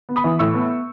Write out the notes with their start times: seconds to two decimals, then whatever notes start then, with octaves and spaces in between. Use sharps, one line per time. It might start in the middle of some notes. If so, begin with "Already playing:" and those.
0.09 B3
0.16 B5 D#6
0.24 E3
0.39 A2 C#6 E6
0.54 B3